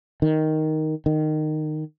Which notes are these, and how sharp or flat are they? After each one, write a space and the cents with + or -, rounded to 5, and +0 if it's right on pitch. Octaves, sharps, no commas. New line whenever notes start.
D#3 +5
D#3 -15